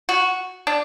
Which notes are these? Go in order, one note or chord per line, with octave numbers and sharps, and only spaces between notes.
F#4
D4